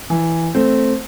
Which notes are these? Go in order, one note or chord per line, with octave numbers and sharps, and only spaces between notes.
E3
A3 C4